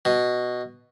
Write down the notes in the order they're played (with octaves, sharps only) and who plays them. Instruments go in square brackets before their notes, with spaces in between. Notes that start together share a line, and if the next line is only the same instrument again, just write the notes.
[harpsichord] B2